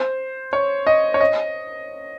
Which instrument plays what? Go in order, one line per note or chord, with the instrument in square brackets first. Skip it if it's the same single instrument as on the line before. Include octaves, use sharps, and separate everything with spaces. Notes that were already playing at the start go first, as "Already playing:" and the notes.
Already playing: [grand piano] C5
C#5
D#5
C#5
D#5